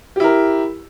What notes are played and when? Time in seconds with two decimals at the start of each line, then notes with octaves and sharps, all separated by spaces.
0.16 G4
0.20 E4
0.24 A#4